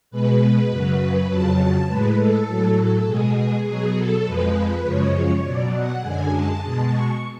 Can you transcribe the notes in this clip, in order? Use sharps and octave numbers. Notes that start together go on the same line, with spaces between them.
B2 G#3 B4
F#2 C#3 F#3
F2 C#3 F#3 A5
A2 G#3 B4
A4
A2 F#3
A4
B2 G#3 G#4
B2 F#3 G#4
A4
F2 F3 G#3 B4
F#2 C#3 F3 G#3 C#5
B2 F#3 D5
F#5
F#2 D3 G#3 G#5
A5
B2 G#3
C#6